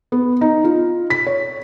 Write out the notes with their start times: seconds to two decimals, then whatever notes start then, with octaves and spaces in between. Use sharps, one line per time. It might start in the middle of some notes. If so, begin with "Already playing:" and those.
0.12 B3
0.41 D#4
0.64 F4
1.10 B6
1.27 C#5